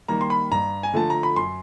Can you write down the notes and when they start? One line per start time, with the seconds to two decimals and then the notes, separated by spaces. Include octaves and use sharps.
0.08 D#3 G3 A#3 A#5
0.21 C6
0.30 B5
0.51 G2 A#5
0.83 G#5
0.94 D3 F3 A3 A5
1.10 A#5
1.23 B5
1.36 F#2 C6